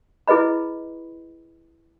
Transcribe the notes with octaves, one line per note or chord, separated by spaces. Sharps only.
E4 G#4 B4 D#5 B5